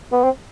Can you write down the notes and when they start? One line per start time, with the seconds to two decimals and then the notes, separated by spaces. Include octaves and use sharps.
0.12 B3
0.24 C4